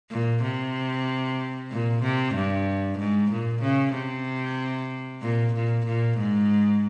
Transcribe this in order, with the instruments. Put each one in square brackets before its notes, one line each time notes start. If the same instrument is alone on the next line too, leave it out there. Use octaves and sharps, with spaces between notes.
[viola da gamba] A#2
C3
A#2
C3
G2
G#2
A#2
C#3
C3
A#2
A#2
A#2
G#2